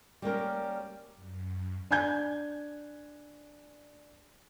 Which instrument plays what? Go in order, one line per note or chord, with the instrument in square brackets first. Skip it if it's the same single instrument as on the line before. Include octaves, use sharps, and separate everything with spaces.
[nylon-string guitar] G3 A#3 C#4 A#4
[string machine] F#2
[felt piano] D4 G#5 G6 G#6